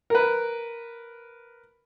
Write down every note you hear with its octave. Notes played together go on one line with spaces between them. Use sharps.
A#4 B4